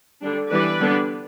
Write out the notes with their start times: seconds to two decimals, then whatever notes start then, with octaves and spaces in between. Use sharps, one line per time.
0.22 D3 G3 D4
0.50 E3 G3 B3 D4 B4 D5
0.80 D3 G3 B3 D4